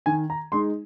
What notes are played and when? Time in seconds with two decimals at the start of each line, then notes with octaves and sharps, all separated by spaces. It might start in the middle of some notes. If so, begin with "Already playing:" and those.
0.06 D#3 G#5
0.30 A#5
0.52 G#3 D#4 C6